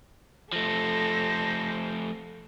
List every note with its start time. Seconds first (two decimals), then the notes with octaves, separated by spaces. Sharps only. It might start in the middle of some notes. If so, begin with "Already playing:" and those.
0.53 F3 A3 A4 C5 A#6